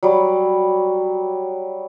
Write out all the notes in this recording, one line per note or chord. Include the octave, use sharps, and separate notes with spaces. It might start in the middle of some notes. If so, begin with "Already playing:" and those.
F#3 G3